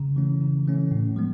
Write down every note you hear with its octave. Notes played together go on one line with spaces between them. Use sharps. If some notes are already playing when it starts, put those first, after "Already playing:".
Already playing: C#3
E3 A3 C#4
C#3
E3 A3 C#4
A2
F3 G#3 B3